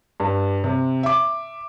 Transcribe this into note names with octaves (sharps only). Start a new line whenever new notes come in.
G2
C3
E5 D6